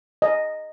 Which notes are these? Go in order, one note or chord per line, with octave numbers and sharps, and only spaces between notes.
D#5